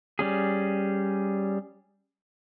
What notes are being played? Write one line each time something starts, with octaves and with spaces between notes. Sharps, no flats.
G3 C#4 G#4